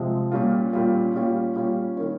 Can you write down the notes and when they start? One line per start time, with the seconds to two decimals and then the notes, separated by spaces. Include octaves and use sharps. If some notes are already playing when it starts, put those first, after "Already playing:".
Already playing: C3 F3 G#3 C4
0.31 A#2 G3 C#4 F4
0.73 A#2 G3 C#4 F4
1.14 A#2 G3 C#4 F4
1.56 A#2 G3 C#4 F4
1.97 D#3 A#3 C#4